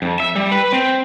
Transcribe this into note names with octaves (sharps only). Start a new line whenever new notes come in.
F2
E5
G3
B4
C4